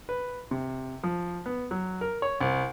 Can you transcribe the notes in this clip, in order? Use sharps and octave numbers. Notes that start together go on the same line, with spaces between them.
B4
C3
F3
B3
F#3
A#4
C#5
C2